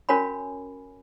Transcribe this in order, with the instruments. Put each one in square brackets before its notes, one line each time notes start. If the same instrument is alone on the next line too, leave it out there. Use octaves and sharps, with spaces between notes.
[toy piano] C#4 F#4 A#4 C#5 G#5 B5